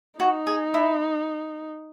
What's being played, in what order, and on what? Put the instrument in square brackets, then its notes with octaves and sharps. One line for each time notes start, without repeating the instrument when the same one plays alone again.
[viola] D#4 [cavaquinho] F#4
[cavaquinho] G#4
E4